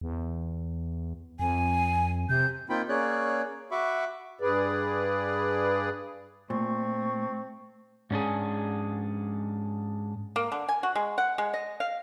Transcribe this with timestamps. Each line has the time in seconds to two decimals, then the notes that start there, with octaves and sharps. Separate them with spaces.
0.01 E2
1.40 F2 G#5
2.29 C3 G6
2.69 A#3 C4 D#4 F4 G5 B5
2.89 A#3 C#4 G#4 C#5 D5 F#6
3.71 F#4 E5 B5 C#6 D6
4.41 G2 G#4 B4 D5
6.50 A#2 A3 C4 C#6
8.11 G#2 C#4 D4 G#4
10.36 A#3
10.52 D3
10.69 G#5
10.83 F#4
10.96 G#3
11.18 F#5
11.38 G#3
11.54 D#5
11.80 F5